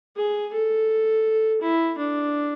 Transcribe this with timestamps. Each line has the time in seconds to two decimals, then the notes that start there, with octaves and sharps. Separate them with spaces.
0.17 G#4
0.53 A4
1.62 E4
1.98 D4